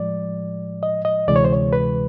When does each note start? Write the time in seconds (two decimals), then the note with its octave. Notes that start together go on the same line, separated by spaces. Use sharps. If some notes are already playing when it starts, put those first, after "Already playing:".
Already playing: A2 F3 G#3 D5
0.83 D#5
1.05 D#5
1.28 D2 C3 E3 G#3 D5
1.36 C#5
1.45 C5
1.53 C#5
1.73 B4